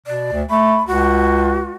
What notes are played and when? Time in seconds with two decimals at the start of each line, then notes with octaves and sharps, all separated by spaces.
0.06 B2 D5
0.32 D2
0.50 A3 B5
0.87 C#2 F#4